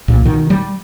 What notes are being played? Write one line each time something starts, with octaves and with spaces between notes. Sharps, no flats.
C2 A#2
B2 D#3
G3